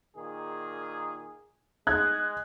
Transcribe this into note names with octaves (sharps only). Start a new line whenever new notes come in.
A#2 D#3 G#4
G#3 F#6 G#6